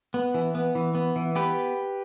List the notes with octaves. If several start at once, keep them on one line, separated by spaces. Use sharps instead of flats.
B3
E3
B3
E3
B3
E3
B3 G4 B4